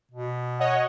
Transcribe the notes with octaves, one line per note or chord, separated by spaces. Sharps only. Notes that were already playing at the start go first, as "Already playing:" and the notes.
B2
C#5 D#5 F#5